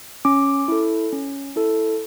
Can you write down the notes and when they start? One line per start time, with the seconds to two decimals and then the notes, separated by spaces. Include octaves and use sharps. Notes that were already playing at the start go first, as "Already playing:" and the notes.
0.25 C#4 D6
0.68 E4 A4
1.13 C#4
1.56 E4 A4